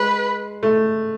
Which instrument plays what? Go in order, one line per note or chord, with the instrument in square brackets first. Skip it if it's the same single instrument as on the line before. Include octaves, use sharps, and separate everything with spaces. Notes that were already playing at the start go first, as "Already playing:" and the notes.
Already playing: [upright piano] G#3 [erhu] B4
[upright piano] A3